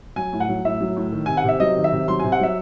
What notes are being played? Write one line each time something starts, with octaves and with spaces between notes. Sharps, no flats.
F#3 G#5
A2
F#5
F#3
A2 E5
F#3
A2
D#3
C3 G#5
F#5
C3 E5
F#3 D#5
D#3
E5
C3
F#3 C6
C3 G#5
F#5
F#3 E5